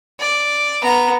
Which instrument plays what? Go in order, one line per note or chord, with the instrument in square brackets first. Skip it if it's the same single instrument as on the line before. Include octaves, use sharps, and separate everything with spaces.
[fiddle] D5
B3 A#5